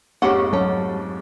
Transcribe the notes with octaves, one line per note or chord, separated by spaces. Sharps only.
F2 G#2 C#4 G4 G#4 F#5 C#6 D6
F#3 A3 C#4